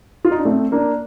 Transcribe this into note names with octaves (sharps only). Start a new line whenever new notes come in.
F4
D#4
D4
A3 C4
A#3 D4